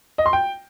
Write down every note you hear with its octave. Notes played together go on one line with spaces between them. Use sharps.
D#5
C6
G5